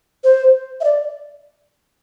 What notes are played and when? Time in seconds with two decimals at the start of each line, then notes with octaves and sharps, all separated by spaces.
0.24 C5
0.81 E5
0.84 D5